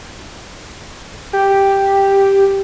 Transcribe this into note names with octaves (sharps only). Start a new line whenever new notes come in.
G4